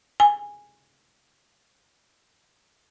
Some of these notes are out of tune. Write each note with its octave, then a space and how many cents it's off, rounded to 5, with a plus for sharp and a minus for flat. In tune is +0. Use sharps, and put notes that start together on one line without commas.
G#5 -10